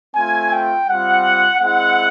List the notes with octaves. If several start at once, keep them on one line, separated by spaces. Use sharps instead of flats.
A3 C4 F4 G#5
G5
G3 C4 F4 F#5
G#3 C4 E4 F#5